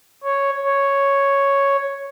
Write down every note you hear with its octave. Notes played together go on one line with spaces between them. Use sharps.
C#5
C#5